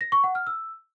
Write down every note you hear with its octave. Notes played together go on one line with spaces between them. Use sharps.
A#6
C#6
F#5
F6
E6